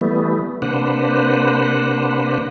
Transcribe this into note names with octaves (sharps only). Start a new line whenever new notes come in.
E3 G3 A3 B3
C3 A#3 D4 B4 C5 F#5